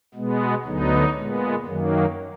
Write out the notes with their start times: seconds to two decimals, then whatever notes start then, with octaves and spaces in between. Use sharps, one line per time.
0.15 B2 G#3 B3
0.65 D2 D3 F#3 B3 D#4
1.15 A#2 G#3 B3
1.65 F#2 D#3 F#3 A#3